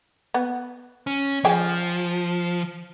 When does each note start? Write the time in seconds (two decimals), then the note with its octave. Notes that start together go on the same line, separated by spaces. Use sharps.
0.34 B3
1.07 C#4
1.45 F3 G#4 G5